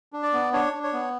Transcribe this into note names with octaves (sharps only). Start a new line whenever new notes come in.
D4
D5
B3
D4 C#5
D4
C#5
B3